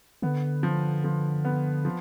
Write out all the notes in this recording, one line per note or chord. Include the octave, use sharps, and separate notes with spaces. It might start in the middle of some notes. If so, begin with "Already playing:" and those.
D3 B3
F3
F3
B3
F3